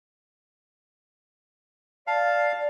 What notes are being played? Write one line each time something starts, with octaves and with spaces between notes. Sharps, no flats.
D5 F5 A5